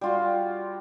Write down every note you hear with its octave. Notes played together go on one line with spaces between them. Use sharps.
G3 F4 F#4